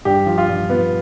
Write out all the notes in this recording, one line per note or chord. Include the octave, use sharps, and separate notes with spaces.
G2 G4
F3
F4
G2
F3 B3